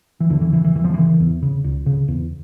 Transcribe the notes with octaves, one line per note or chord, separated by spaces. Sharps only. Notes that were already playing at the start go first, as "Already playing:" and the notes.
E3
E2 D3
E3
C#3 E3
E3
E2 E3
F3
C#3 E3
E2
C#3
C#2
C#3
E2